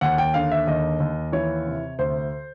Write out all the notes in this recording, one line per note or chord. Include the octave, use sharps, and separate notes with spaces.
D#2 F#5
G5
D3 F5
E5
D#2 D#5
D#2
E3 C#5
C3
D2 C5